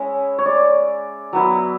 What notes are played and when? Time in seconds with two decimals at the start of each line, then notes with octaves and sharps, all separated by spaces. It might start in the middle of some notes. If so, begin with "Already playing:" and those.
Already playing: G#3 C#4 E4
0.38 C#5
0.46 D5
1.33 F#3 B3 E4